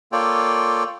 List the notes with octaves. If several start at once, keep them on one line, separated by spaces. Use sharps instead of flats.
A#3 F4 A4 C#5 D5 G5